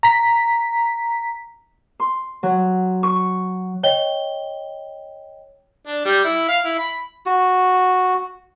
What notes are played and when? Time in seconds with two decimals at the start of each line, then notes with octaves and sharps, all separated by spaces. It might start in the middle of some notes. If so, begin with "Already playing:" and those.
0.03 A#5 B6
2.00 C6
2.43 F#3
3.03 C#6
3.83 C#5 D#5 G5 G7
5.87 D4
6.05 G3
6.25 E4
6.48 F5
6.64 E4
6.79 B5
7.26 F#4